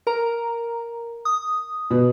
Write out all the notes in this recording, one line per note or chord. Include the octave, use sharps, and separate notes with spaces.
A#4 A#5
D#6
B2